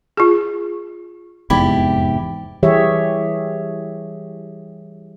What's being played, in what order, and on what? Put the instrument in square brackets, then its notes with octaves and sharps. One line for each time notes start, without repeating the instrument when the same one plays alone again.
[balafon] F4 G#4
[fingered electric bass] F1 E2 G#2 [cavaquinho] E4 G4 D5
[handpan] E3 G3 G4 G#4 C#5 E5